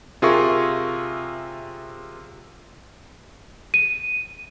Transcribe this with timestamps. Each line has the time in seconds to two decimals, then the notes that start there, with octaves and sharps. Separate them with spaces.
0.22 C3 F4 G#4 A#4 E5 C#6
3.74 D#7